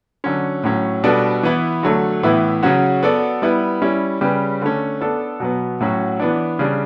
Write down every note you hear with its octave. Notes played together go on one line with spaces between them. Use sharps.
D3 F#3 C#4
A2 F#3 C#4
B2 G3 B3 D4 A4
E3 B3 E4
D3 F#3 A3
A2 E3 B3 E4
C#3 F#3 C#4 F#4
B3 F#4 A4 D5
G3 B3 E4 B4
G3 C#4 E4
C#3 G3 C#4 G4 B4
D3 A3 C#4
B3 D4 A4
B2 F#3 B3
A2 F#3 C#4 F#4
E3 B3 D4
C#3 G3 D4